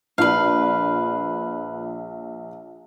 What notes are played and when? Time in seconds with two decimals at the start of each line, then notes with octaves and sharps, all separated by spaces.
0.18 A#1 F4 B4 D5 F5